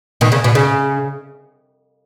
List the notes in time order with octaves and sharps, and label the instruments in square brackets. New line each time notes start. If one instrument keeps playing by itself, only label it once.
[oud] B2 D#3
C#3
B2
C#3